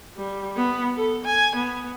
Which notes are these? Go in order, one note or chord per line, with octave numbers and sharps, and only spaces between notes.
G3
B3
A4
G#5
B3